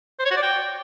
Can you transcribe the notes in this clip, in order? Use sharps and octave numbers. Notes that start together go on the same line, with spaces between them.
C5
C#5
F#4
D5
G5